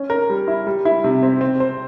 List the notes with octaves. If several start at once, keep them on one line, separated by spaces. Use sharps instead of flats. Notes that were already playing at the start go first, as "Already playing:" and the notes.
Already playing: C#4
A#4
G3
E4
G3
E4
C3
C4
C4
C5